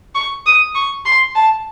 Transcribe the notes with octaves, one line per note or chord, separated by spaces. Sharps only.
C#6
D#6
C#6
C6
A5